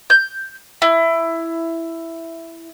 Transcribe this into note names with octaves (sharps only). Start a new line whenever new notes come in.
G6
E4